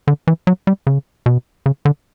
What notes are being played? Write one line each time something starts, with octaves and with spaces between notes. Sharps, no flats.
D3
E3
F#3
G3
C#3
B2
C#3
D3